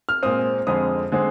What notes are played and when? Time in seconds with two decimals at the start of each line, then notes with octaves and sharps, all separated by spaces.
0.09 F6
0.23 A#2 G#3 C4 D#6
0.67 F2 D3 G#3 C4 D#6
1.12 D3 G#3 C4